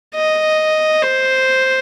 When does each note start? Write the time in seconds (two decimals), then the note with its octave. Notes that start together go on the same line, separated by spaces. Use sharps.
0.15 D#5
1.02 C5